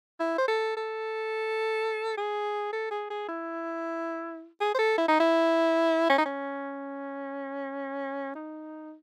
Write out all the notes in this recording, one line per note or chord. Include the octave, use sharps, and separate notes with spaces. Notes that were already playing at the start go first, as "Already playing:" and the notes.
E4
C5
A4
A4
G#4
A4
G#4
G#4
E4
G#4
C5
A4
E4
D#4
E4
C#4
D#4
C#4
D#4